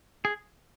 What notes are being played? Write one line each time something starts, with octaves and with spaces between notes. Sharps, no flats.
G#4